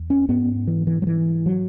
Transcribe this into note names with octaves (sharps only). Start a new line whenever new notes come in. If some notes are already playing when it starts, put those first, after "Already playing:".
Already playing: E2
C#4
G#2 B3
E3
E3
F#3
E3
F#3